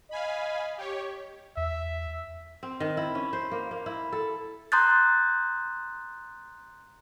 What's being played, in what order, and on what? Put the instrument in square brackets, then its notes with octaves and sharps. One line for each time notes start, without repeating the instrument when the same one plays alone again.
[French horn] D#5 [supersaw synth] F5 G#5 B5
[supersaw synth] G4 C#5
[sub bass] E2 [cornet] E5
[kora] C4
D#3
E4
C#4
C5
A#3
A#3
E4
A4
[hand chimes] A#5 C6 D#6 F#6 G6 A6